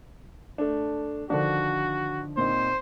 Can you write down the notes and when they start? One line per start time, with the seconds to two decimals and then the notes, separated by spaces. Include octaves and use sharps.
0.58 A3 D4
1.30 D3 D#3 F3 D4 F#4
2.37 A#2 C4 D#4 C5